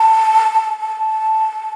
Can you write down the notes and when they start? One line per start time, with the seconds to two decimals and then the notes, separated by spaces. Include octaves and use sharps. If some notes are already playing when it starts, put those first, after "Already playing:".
Already playing: A5
0.79 A5